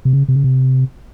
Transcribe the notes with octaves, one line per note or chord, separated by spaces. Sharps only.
C3
C#3
C3
C#3
C3